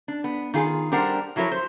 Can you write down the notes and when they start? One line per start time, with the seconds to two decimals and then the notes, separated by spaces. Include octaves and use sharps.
0.08 D4
0.24 B3
0.54 D#3 F4 G#4
0.92 G3 D4 A#4 C5 F#5
1.36 F3 F#3 E4 A#4 C#5
1.52 C5